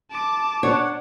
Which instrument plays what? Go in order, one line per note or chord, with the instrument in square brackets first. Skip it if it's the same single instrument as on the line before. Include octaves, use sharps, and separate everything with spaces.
[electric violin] A5 D6
[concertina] D4 F#5 [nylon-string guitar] C#5